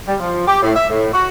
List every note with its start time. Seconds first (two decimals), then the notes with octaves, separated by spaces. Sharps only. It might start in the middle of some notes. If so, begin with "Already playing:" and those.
0.08 G3
0.20 F3
0.47 G4
0.62 A2
0.75 E5
0.90 A2
1.13 F#4